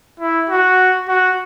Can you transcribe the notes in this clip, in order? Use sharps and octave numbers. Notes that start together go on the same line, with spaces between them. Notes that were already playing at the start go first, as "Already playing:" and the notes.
E4
F#4
F#4